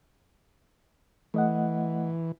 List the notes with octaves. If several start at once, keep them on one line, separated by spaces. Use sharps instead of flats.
E3 A3 D#5 F#5